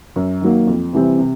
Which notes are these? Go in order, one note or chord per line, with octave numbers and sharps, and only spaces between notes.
F#2
D#3 F#3 A#3
F2
C3 E3 G3 C4
C3